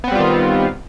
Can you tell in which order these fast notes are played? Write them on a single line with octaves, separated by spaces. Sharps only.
B3 C4 G3 F4 D#3